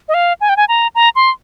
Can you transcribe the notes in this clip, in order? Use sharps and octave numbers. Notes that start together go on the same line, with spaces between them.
D#5
F5
G#5
G5
G#5
A#5
A#5
C6